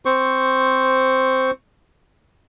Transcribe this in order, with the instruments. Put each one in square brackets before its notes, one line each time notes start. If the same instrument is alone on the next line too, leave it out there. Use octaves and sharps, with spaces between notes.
[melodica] C4 C5 C#6